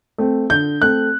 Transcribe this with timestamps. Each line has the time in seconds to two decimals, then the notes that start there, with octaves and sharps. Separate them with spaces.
0.18 A3 C4
0.50 D3 G6
0.81 A3 C4 F#6